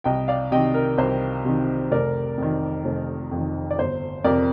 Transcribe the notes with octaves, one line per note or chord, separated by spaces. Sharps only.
C2 D#5 G5
D5 F5
C3 D#3 D#5 G5
A#4
C2 C5
C3 D#3
F1 A#4 D5
F2 D#3
F1
F2
D#3
D5
G1 C5
F2 C3 A#4 D5